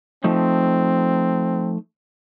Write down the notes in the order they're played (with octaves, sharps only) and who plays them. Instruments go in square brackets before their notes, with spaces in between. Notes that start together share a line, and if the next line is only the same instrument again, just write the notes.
[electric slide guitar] F3 A3 D#4 [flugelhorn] C4